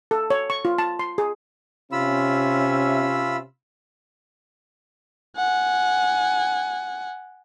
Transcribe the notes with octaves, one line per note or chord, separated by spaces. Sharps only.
A4
C#5
C#6
F4
A5
C6
G#4
C3 C#4 F4 E5 B5 E6
F#5 G#5